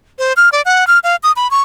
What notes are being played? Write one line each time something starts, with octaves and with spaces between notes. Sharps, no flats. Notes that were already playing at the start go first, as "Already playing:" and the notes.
C5
F6
D5
F#5
F6
F5
D#6
B5
C#6